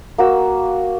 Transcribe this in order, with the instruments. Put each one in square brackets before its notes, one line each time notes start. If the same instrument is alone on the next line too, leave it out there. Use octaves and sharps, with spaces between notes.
[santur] A#3 F#4 E6